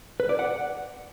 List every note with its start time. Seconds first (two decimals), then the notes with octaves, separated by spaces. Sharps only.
0.20 B4
0.29 D5
0.39 F#5